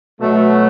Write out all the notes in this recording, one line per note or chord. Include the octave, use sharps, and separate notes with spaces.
B2 F#3 A3